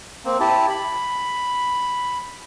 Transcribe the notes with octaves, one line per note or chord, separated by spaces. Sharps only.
A#3 C4
E4 G4 A5
B5